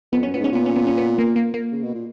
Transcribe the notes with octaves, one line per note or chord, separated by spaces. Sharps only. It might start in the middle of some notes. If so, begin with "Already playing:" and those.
F2 B3
F#2 C#4
A#2 B3
G#2
C#4
A#2 B3
C#4
B3
C#4
B3
A#3
A#3
A#3
C#3
B2
A#2